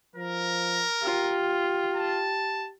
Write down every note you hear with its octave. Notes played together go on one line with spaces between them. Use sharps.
F3 A#4
F4 G4
A5